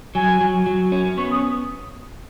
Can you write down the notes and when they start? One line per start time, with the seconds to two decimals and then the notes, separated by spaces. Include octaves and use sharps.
0.15 F#3 G#5
0.41 F#3
0.66 F#3
0.92 C#4
1.17 B3 C#6
1.31 D#6